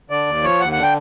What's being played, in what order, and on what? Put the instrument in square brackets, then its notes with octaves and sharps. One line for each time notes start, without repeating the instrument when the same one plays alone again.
[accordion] D3 D5
D#2
F3 C#5
D#2 F#5
D3 F#5
G5